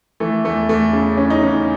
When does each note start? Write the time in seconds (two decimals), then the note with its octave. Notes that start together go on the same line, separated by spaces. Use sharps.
0.20 E3 A3
0.44 E2 A3
0.69 E2 A3
0.93 C#3
1.17 E2 C#4
1.30 D#4
1.42 E2 C#4